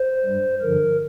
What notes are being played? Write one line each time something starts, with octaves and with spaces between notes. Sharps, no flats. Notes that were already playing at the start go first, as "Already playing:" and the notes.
Already playing: C5
G2 G3
G2 D3 F3 A#4